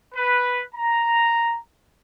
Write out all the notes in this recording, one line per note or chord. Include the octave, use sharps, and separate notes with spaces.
B4
A#5